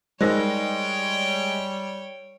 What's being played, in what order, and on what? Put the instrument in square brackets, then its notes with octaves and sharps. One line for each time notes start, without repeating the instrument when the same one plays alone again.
[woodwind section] G3 [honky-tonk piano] G#3 A#6 [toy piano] D#4 A#4 C5 [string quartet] C#5 G5